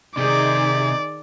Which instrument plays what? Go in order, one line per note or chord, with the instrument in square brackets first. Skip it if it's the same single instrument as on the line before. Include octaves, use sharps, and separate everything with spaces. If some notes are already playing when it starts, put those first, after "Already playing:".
[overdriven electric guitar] C3 [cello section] D#3 D#4 G#4 [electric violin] D5